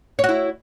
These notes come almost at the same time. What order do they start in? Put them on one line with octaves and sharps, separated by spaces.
C#5 F#4 E4